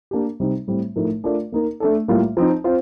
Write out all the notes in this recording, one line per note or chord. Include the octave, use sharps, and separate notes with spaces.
A#3 D4 G4
C3 G3 C4 D#4
A2 G3 C4
A2 F3 A3 D#4 A#4
A3 D4 F4 A#4 D5
A#3 D#4 A#4
A3 D4 A4
A2 G3 A#3 F4
F3 C4 D#4
C4 F4 C5